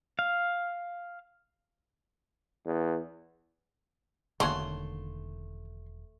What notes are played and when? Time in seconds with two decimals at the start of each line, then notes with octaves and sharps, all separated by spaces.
0.19 F5
2.65 E2
4.40 E1 D3 D#3 A3 A#3 C#4 F#4 C6